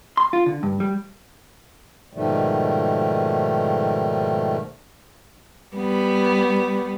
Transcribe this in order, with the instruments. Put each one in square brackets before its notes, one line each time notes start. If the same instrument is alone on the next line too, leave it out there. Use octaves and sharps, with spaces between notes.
[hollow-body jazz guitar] C6
F4
D3
G2
G3
[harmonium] G#2 B2 D#3 F3 G3 A3
[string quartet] G3 B3